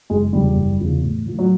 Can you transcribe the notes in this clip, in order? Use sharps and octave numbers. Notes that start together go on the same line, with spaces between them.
F#1 G#3
E2 C#3 F3 G3
F#1
E2 C#3 F3
A1
A2 F3
F#3